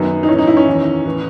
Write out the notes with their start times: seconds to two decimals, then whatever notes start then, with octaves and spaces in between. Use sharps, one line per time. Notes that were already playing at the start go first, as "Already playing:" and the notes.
Already playing: F#2 D#3 B3
0.23 D#4
0.28 A2 E3 C#4
0.38 D#4
0.47 E4
0.57 C#4
0.67 E2 D#3
1.05 A2 E3